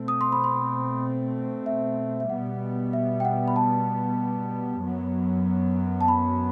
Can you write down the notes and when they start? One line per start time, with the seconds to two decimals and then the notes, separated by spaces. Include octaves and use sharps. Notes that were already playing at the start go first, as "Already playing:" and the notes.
Already playing: B2 A3 C4
0.08 D#6
0.21 C6
0.32 B5
0.44 C6
1.66 E5
2.20 E5
2.29 B2 G3 B3 F#5
2.93 E5
3.20 G5
3.25 F#5
3.48 B5
3.56 A5
4.83 F#2 F#3 B3
6.01 A5
6.08 B5